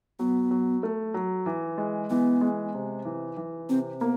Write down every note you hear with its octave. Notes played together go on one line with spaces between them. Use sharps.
F#3 B3
F#3
A3
F#3
E3
G#3
E3 B3
G#3
C3
E3
E3
C3 C4
A#3 B3